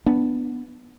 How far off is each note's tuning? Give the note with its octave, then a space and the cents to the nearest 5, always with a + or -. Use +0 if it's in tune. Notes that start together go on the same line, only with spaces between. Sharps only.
B3 +0 D4 +5